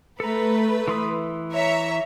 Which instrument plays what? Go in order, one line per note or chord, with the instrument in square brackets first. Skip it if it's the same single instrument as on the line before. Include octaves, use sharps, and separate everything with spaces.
[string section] A3 B4 [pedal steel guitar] A4 A#5
[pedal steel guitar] E3 C6 D#6
[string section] C#5 E5 A#5